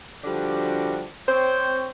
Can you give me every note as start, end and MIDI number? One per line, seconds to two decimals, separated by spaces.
0.24 1.05 50
0.24 1.05 53
0.24 1.05 55
0.24 1.05 62
0.24 1.05 66
0.24 1.05 67
1.28 1.87 60
1.28 1.87 72
1.28 1.87 73